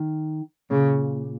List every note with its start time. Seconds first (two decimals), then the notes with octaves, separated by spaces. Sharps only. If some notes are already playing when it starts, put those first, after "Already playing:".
Already playing: D#3
0.71 A#2 C#3